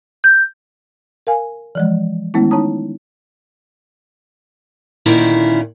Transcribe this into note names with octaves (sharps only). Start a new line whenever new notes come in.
G6
A#4 F5 G#5
E3 F3 G#3
D#3 G#3 A3 B3 C#4 E4
D#4 C#5 A5 A#5 D#6
D2 A#2 D#3 C#4 E4 C5